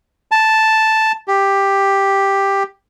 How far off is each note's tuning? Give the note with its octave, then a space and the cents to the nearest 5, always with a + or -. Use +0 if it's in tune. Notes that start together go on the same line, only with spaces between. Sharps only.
A5 +0
G4 +5